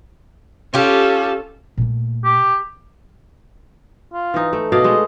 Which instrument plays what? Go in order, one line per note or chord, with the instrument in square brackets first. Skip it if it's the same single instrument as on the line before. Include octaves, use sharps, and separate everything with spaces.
[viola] C#4 A4 [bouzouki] F4 G4
[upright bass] A#2 A3
[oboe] G4
[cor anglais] F4
[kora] E3 D#4
A3
[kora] B2 D5 F5 [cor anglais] D#5
[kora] G#3 A3